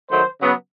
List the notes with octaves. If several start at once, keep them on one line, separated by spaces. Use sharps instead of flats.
D#3 F#3 A3 C5
C#3 F#3 B3